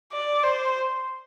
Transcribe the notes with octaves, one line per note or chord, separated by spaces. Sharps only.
D5
C5